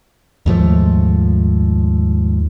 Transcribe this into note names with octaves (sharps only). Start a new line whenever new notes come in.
D#2 G#2 F3 A3